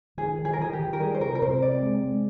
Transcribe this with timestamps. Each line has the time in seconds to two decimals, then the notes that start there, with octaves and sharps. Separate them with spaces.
0.17 D#3 G#4
0.38 D#3
0.45 G#4
0.53 A#4
0.59 D#3 G#4
0.73 G4
0.79 D#3
0.93 A#4
1.00 G3 G#4
1.15 C5
1.20 C3 A#4
1.35 A#4
1.42 C3 C5
1.62 C4 D5
1.82 G#3
2.03 G#3